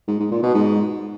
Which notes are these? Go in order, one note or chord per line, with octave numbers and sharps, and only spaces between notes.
G#2
G#2
A#2
B2
G#2